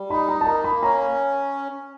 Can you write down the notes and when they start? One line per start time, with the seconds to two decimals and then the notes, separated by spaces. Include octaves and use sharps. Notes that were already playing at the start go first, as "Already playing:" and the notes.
Already playing: G3
0.10 D#4 B5
0.29 A#5
0.41 A5
0.46 A#3 A#5
0.64 B5
0.82 C#4 A#5